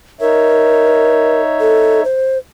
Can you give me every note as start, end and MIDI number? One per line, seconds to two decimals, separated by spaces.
0.21 2.03 63
0.21 1.41 70
0.21 2.03 73
0.21 2.03 76
1.60 2.01 69
2.04 2.38 72